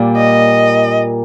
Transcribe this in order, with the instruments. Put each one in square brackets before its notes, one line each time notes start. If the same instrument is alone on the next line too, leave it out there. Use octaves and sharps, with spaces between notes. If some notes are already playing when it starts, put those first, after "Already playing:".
Already playing: [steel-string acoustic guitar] A#2 G3 A#3
[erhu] D#5